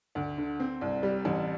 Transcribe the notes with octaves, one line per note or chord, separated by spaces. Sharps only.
D2
D3
C4
C2
G3
A1